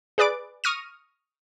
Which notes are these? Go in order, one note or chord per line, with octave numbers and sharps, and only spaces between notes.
G#4 B4 D5 D6 D7
C#6 D#6 F6 A#6 D#7